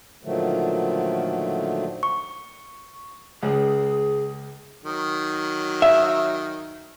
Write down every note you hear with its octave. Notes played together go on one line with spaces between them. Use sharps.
A#2 D3 D#3 F3 F#3 A3
C#6
C#2 G#4
D#3 F#3
E5